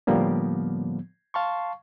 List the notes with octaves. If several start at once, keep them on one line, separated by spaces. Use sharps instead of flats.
A2 D3 F3 G3 A#3 B3
F5 A5 C6 C#6